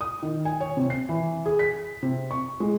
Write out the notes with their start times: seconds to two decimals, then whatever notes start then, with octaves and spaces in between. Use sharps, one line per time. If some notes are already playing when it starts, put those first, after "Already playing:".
0.01 D#6
0.22 D#3
0.45 G#5
0.60 C#5
0.77 C3
0.90 C7
1.09 E3
1.46 G#4
1.59 B6
2.03 C3
2.31 C#6
2.60 G#3